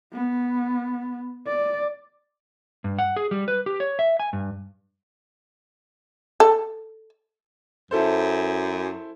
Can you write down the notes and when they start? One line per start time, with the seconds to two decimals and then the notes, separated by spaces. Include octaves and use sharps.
0.13 B3
1.47 D5
2.84 G2
2.99 F#5
3.16 G#4
3.31 G3
3.48 B4
3.66 G4
3.80 C#5
3.99 E5
4.20 G#5
4.33 G2
6.40 A4
7.91 F#2 E4 A4 C5